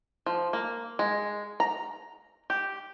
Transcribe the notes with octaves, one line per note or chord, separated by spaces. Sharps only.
F3
A#3
G#3
A#5
G4